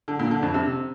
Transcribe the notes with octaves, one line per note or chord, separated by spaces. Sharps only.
D3
A#2
D3
F2
C3